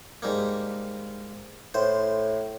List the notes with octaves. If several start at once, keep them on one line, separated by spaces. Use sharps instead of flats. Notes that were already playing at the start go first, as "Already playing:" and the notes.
G#2 G3 A#3
A2 C5